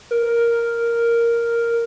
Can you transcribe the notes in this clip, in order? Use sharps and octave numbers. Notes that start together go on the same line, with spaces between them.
A#4